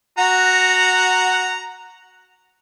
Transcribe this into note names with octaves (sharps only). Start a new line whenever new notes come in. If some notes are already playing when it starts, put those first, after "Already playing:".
F#4 F#5 A#5